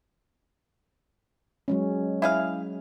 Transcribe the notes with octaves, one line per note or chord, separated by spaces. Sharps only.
F#3 G#3 C#4
E4 G#4 F5